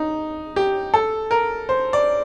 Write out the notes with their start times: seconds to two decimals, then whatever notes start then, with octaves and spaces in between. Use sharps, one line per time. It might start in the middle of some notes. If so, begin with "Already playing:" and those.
Already playing: D#4
0.56 G4
0.94 A4
1.31 A#4
1.69 C5
1.93 D5